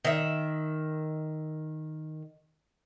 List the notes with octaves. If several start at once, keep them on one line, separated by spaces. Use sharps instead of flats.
D#3 E5